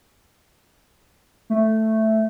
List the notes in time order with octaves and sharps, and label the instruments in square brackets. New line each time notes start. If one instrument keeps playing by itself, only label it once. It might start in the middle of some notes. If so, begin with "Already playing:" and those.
[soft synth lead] A3